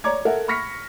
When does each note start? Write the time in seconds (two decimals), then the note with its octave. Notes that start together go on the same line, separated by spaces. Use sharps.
0.04 C#5 D5 A#5 D6 G#6
0.25 A4 A#4 E5 F#5
0.48 B5 C#6 F6 A#6 B6 C#7